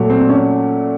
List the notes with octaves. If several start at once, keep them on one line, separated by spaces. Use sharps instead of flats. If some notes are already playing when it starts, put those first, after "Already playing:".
Already playing: A#2 F#3 A3
C4
C#4